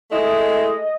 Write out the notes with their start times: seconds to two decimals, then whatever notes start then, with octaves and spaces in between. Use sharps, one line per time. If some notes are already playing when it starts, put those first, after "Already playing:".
0.11 G#3 A3 E4 D#5